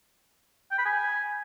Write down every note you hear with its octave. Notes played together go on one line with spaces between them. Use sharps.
G5
B5
G#5